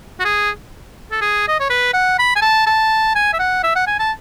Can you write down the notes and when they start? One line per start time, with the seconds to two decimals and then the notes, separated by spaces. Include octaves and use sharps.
0.20 F#4
0.25 G#4
1.11 A4
1.21 G#4
1.48 D#5
1.60 C#5
1.70 B4
1.93 F#5
2.19 B5
2.36 G#5
2.42 A5
2.67 A5
3.15 G#5
3.33 E5
3.39 F#5
3.63 E5
3.75 F#5
3.87 G#5
3.99 A5